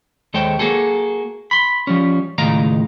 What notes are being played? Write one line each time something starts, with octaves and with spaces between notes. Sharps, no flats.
D#2 G#3 A4 C5 C#5 G5
A#3 F#4 G#4 A4
B5 C6
F3 G3 C#4
C#2 A2 D#3 D#5 F5 A#5